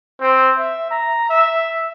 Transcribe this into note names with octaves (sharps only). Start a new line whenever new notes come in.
C4
E5
A#5
E5